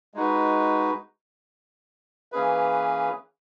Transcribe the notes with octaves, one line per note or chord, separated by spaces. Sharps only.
G#3 D#4 F#4 B4
E3 A#3 C#4 G#4 B4